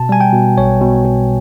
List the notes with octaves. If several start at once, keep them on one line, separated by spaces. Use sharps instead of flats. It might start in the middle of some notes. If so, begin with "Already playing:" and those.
Already playing: B2 A5
G3 G#5
G5
B2
B1 C#5
B2
B2